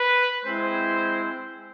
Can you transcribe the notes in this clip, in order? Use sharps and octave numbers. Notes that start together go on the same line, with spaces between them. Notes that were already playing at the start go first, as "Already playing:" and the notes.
Already playing: B4
G#3 C4 E4 C5